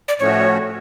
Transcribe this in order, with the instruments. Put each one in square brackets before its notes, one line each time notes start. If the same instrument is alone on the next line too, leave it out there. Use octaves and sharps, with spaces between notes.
[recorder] D5
[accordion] A2 F3 A3 C#4 F#4 [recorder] C#5